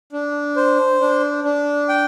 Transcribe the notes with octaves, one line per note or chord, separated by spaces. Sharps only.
D4
C5
D4
D4
G5